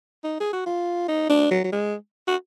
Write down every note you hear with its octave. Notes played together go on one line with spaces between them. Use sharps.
D#4
G#4
F#4
F4
D#4
D4
F#3
F#3
G#3
F#4